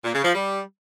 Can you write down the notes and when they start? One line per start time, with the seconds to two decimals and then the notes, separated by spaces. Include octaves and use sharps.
0.04 A#2
0.14 C#3
0.24 F3
0.34 G3